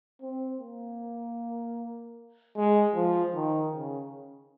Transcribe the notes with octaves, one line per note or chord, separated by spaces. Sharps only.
C4
A#3
G#3
F3
D#3
C#3